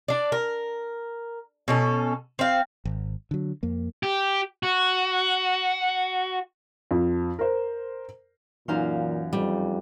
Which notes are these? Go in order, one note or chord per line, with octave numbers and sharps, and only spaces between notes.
D4 D5
A#4
B2 C#4 A4
C4 F5
G#1
D3 F#3
F2 A#3
G4
F#4
F2
A#4 C5
F#2 A#2 E3 D#4 F5 C6
F2 G3